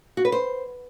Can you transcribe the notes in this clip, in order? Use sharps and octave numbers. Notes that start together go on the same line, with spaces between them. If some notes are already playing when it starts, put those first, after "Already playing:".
F#4
B4
C5